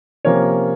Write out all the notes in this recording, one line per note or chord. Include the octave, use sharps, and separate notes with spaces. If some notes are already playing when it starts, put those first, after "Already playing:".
C3 F3 A#3 C#4 A#4 C#5